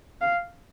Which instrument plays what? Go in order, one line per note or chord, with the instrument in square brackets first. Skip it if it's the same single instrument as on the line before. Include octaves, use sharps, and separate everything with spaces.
[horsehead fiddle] F5